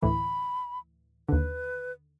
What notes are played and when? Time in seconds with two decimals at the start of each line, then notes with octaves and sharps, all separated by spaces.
0.02 D2 A2 E3 B5
1.28 D#2 D3 B4